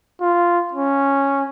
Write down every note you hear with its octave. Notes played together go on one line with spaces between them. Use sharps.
F4
C#4